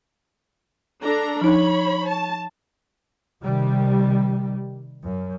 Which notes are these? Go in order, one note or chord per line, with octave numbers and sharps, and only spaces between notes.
D4 A4 A#5
F3 D#4 C#5 B5
A5
C3 D#3 G3
F#2